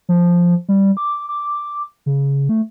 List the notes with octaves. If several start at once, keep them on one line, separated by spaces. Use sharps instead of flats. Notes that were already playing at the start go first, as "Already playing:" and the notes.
F3
G3
D6
D6
C#3
A3